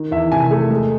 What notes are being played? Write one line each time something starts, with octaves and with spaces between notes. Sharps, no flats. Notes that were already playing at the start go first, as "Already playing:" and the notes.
Already playing: D#3
E2 E5
C3 G#5
A3
G#3